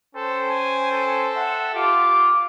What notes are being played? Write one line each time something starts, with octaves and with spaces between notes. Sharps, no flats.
C#4 A4 C5 G5
G#5
A4
E5 F#5
F4 G4 D6